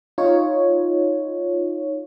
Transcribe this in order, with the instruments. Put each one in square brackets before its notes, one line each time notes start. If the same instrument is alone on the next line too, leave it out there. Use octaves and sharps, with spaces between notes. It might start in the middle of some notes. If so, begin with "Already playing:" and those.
[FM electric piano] D#4 F4 C#5